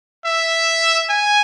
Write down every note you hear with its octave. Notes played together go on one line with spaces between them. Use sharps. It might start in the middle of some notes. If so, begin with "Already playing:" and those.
E5
G#5